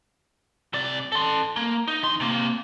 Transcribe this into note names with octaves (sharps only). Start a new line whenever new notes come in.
C3 D5
A4 C6
A#3
D#4
E2 C6
C3 A#3